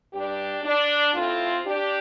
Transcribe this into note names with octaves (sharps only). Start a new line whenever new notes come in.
G2 G3 D4 G4
D4
A2 A3 C4 F4
D4 G4